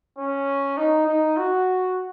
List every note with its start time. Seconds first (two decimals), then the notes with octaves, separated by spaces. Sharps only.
0.18 C#4
0.77 D#4
1.07 D#4
1.37 F#4